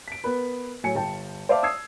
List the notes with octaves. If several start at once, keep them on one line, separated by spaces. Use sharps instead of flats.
B6 D7
B3 A#4 B4
A2 F#3 G#5 C#7
G1 G5 A5
C5 D5 E5 F5 A5 D6
D#6 E6 G#6 C7